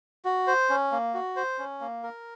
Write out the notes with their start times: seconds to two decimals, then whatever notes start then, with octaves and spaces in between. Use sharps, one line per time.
0.25 F#4
0.47 C5
0.70 C#4
0.92 A#3
1.14 F#4
1.36 C5
1.59 C#4
1.81 A#3
2.03 A#4